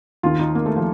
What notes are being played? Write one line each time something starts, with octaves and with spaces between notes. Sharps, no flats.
D#2 D#3 F4
D#4
A#3
A3
F3